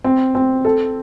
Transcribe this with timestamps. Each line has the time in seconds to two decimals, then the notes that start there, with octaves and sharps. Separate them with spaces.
0.04 C4
0.35 C4
0.65 A4